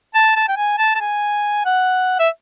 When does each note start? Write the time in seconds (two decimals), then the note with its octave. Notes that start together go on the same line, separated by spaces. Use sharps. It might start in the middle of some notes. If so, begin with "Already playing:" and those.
0.15 A5
0.36 A5
0.48 G5
0.57 G#5
0.78 A5
0.95 A5
1.01 G#5
1.65 F#5
2.19 E5